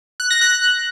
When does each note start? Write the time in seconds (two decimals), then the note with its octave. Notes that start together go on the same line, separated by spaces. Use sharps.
0.20 F#6
0.30 A#6
0.41 F#6